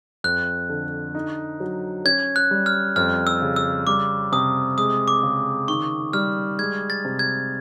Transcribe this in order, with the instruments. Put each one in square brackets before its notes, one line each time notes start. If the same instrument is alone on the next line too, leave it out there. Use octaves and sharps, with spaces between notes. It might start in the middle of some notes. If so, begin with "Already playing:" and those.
[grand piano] F2 [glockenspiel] F#6
[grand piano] D3
D#4
F#3
[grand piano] C#4 [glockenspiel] G#6
[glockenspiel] F#6
[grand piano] G3
[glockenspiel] F6
[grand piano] F2 [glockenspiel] F6
[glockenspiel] E6
[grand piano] C#3
[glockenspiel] E6
[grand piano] G3 [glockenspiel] D6
[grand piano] C3 [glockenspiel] D#6
[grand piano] G#3 [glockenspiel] D#6
[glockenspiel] D6
[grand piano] C#3
[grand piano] D#3 [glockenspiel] C#6
[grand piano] G3 [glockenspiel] F6
[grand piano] G#3 [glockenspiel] G#6
[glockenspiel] A6
[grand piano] C3
[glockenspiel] G#6